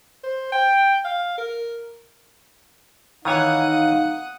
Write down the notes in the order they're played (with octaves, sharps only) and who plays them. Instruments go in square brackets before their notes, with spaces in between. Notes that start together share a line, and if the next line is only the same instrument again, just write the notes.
[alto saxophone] C5
G5
F5
A#4
[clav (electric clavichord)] D#3 E3 C#5 [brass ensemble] D#4 F5 [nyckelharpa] F#5 D#6